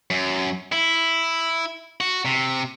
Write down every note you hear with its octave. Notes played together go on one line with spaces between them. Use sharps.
F#2
E4
F#4
C3